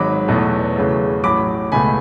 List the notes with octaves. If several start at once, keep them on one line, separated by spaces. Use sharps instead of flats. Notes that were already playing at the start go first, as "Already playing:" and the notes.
Already playing: G#1 G#2 F#3 B5 D6
E2 B2 F#3 A3
E2 C#3 F#3 A3
A1 A2 F#3 B5 D6
C#2 B2 A3 G#5 B5